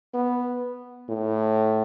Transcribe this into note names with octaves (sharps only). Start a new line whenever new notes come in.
B3
A2